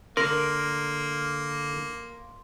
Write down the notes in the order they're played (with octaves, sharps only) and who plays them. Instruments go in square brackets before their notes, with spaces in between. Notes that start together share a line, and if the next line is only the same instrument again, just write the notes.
[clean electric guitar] D3 [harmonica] A#3 [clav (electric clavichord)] A#4 [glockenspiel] C6